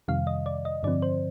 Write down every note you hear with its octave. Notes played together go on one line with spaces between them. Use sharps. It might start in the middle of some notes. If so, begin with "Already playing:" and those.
F2 C3 D#3 G3 F5
D#5
D5
D#5
G2 D3 F3 C4 D5
C5